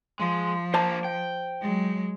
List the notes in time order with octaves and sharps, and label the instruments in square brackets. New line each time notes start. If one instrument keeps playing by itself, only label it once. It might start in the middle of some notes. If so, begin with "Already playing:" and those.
[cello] F3 [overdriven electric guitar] G#3
[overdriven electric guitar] A#3 D4 [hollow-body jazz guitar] C5 G#5 A5
[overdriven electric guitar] G5
[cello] F#3 G#3